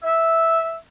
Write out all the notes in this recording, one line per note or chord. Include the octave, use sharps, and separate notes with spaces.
E5